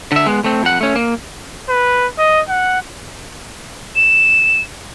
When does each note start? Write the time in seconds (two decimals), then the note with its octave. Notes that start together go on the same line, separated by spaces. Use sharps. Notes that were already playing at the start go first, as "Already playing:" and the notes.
0.12 D3 E5
0.26 G#3 B3
0.44 A3 C4
0.63 F2 F#5
0.81 A3 C#4
0.96 A#3
1.69 B4
2.18 D#5
2.49 F#5
3.96 E7